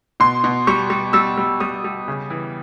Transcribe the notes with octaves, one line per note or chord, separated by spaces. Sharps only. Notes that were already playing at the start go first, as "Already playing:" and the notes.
B2 C6
B2
G3 C#6
G3
G3 E6
G3
G3 D#6
G3
C#3
E3